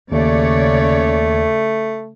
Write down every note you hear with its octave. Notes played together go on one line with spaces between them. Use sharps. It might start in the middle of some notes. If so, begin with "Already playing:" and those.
D#2 C#3 A3 C#5 D5